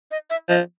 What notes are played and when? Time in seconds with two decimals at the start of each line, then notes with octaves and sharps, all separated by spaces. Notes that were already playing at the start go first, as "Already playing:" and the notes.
0.11 D#5
0.30 E5
0.49 F3 D#5